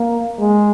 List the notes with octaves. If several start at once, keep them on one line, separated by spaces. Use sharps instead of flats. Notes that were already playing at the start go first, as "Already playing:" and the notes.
Already playing: A#3
G#3